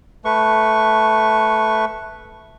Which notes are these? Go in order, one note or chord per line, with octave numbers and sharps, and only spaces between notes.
A3 B4 C#6